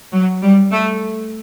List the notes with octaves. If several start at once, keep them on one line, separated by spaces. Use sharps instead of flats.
F#3
G3
A3